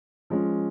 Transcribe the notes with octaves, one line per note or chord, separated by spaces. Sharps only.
F3 G#3 C#4